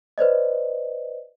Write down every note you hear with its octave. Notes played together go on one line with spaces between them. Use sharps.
B4 C5 D5 D#5